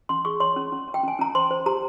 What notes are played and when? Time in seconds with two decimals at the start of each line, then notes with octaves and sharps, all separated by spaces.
0.09 C#4 C6
0.25 G#4 C#6
0.40 C#5 C6
0.56 C#4
0.72 C#4
0.88 C#4
0.94 G5
1.04 C#4 G#5
1.19 C#4 A#5
1.35 C5 C6
1.50 C5
1.66 G4 A#5